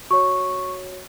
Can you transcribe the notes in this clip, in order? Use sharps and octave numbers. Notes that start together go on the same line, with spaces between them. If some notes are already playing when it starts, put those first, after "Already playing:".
F#4 C#5 C#6